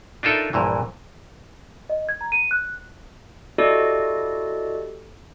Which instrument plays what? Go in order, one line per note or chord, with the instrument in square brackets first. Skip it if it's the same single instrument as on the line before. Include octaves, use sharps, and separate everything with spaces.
[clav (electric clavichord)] D4 D#4 F4 A4 A#4 E5
A#1 G2 A#2 E3
[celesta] D#5
G#6
A#5
D#7
F#6
[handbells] E4 F#4 G4 A4 D5 D#5